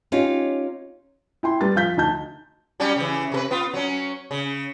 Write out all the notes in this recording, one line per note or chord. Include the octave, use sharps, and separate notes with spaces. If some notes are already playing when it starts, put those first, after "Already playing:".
C#4 D#4 F4 G4
E4 G5 C6
G3 B4 A6
F3 F5 G6 B6
D2 D#4 A5 G6
F#3 G3 C#4
C#3 E3
C3 A4 B4
B3 F4
F#3 C#4
C#3